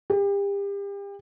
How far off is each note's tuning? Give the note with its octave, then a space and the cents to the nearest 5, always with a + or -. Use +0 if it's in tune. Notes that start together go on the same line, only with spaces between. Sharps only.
G4 +35